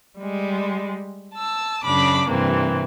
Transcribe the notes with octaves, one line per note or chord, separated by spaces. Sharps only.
G3 G#3
A5 E6
F#2 C#3 D4 B5 D6
G2 C3 E3 A#3 C4